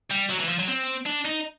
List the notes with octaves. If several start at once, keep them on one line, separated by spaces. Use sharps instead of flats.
G3
F#3
E3
F3
F#3
C4
D4
D#4